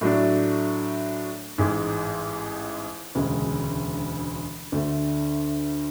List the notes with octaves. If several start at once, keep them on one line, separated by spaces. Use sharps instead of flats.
A2 F#3 A3 D4
A1 G#2 G#3
E1 D2 C#3 G#3
D2 D3 A3 D4